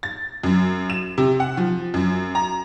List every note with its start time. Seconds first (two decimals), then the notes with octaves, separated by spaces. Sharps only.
0.03 A6
0.43 F#2
0.90 E7
1.18 C3
1.40 F#5
1.57 F3
1.94 F#2
2.35 A#5